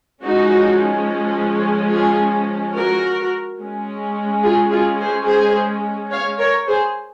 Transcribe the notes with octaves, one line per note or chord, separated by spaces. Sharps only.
F3 G#3 C#4 D#4 F#4
F4 G#4
F#4 A#4
G#3 C#4
F4 G#4
F4 G#4
G#4 C5
G#4 C5
C#5 F5
A#4 C#5
G#4 C5